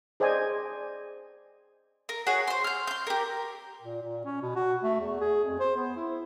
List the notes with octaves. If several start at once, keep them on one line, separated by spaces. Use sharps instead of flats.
G#4 C5 D5 D#5 G#5
A#4
F#4 G#4 C#5 F#5
C5 C6
F6 G6
C6 G6
G4 A#4
A#2
A#2
C#4
B2
F#4
A3
E2
G#4
F2
C5
B3
E4